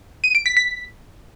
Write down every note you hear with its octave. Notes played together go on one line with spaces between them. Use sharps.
D#7
D7
B6
B6